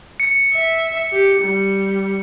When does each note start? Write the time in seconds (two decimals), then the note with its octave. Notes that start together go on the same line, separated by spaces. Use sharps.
0.20 C#7
0.53 E5
1.12 G4
1.41 G3